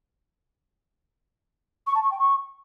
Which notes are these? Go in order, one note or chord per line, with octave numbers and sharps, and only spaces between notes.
C#6
A5
C#6
G5
C#6